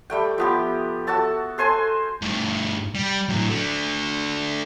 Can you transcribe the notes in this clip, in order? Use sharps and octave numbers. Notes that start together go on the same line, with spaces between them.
G3 A3 G5
F3 B3 G4
F#4 A4 A5 E6
A4 C5 G#5 C6
G2 A3
G3
A2 F#3
A3 D4